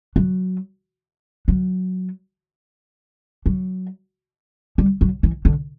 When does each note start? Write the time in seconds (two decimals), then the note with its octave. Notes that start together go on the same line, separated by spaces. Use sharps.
0.16 F#3
1.48 F#3
3.46 F#3
4.78 G3
5.01 F#3
5.23 E3
5.45 D3